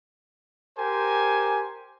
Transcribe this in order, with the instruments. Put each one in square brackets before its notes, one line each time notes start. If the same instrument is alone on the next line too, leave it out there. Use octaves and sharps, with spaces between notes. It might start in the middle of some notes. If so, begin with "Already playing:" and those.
[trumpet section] G4 A#4 C5 G#5